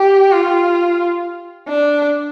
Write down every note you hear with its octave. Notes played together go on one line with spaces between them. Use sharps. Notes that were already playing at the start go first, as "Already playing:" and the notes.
Already playing: G4
F4
D4